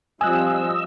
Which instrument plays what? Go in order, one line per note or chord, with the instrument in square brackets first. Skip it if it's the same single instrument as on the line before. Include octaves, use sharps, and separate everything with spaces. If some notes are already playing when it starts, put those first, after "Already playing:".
[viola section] F3 G3 C4 [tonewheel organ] D#5 E6 [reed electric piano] G#5 F#6